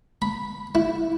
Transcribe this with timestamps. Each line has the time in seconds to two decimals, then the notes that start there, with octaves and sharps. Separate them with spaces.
0.22 B5
0.75 E4